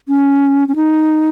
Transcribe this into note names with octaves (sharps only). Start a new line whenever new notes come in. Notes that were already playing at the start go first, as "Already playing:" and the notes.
C#4
C#4
D#4